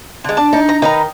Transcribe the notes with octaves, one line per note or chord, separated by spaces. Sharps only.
D3 G#3
D4 D5 A5
D#4
A#5
D#3 D#4 B4 A#5